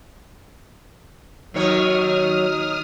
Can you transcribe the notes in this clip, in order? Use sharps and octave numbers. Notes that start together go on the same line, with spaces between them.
D#2 D#3 F#3 C#5 D#6 F6